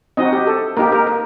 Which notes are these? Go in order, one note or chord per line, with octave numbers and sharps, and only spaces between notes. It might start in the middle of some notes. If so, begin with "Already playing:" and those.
C4 D#4 F#4 D#5
G4
A4
A#3 D#4 G4 A#4
A#4
A#4